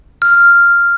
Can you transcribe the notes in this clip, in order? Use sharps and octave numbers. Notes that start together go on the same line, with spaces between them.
F6